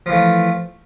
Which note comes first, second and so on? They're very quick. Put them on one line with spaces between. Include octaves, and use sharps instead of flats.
F3 E3 A3